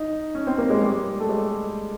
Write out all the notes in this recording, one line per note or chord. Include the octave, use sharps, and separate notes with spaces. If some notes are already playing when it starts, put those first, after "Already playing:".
Already playing: D#4
C#4
C4
A#3
G#3
G3
A3
G#3